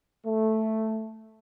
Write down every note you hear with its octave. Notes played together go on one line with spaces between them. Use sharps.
A3